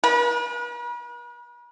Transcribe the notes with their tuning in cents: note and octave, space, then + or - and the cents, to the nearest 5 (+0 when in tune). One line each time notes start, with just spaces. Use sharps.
B4 -45